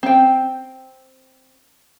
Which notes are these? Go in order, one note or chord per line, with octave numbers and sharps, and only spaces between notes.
C4 G5